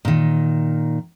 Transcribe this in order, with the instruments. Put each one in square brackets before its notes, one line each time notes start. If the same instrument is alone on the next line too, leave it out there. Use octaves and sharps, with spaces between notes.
[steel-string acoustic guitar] A#2 D#3